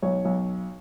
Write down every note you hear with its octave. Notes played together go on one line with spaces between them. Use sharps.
B1 C#5
B1